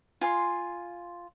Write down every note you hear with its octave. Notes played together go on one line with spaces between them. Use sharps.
F4 G#5 C6